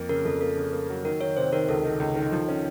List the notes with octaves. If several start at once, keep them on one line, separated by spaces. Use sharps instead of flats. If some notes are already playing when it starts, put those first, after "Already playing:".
Already playing: F2 A#3
C#3 A#4
F2 A4
A#3 A4
C#3
A#3
F#3
D#3 A#4
D#3 C#5
C3 C5
D#3 A#4
C#2 A4
D#3
C#2
D#3
F3
C#4